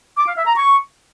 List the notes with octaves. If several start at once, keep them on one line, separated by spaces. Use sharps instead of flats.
D6
F5
E5
A#5
C#6